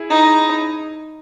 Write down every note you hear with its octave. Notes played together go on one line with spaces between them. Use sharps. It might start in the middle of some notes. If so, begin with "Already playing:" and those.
Already playing: E4 G#4
D#4